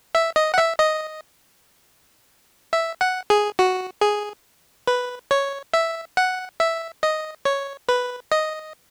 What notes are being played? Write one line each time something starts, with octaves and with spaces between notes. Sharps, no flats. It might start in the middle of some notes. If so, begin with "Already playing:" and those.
E5
D#5
F#5
E5
D#5
E5
F#5
G#4
F#4
G#4
B4
C#5
E5
F#5
E5
D#5
C#5
B4
D#5